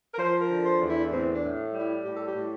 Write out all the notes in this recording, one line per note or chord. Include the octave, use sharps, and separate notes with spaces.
A#4
F3 C5
A#4
D3
C5
E2
E4
A2 C4
D4
A2
G3
E4
A2 G4
A4
G4
A2